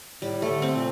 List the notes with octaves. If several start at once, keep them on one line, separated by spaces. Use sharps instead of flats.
A2 G3
A3
D3
C4
A#2